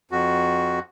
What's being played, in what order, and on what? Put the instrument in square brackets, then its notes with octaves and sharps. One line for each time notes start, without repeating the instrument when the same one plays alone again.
[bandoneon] F2 F#4